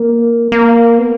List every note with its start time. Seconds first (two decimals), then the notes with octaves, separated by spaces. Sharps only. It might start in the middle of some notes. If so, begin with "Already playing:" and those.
Already playing: A#3
0.52 A#3
0.98 B3